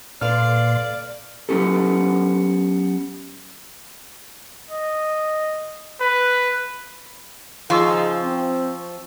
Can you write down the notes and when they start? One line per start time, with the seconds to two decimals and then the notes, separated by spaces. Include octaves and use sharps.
0.21 A#2 A4 B4 D5 F5 C6 F6
1.49 F#3 A#3 B3 C#4 G4 A4
4.70 D#5
6.01 B4
7.70 C#3 F3 D#4 G#4 F5 C#6 E6
8.22 C4